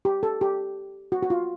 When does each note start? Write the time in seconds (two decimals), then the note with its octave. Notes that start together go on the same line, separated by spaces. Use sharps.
0.05 G4
0.23 A4
0.41 G4
1.12 F#4
1.23 F#4
1.30 F4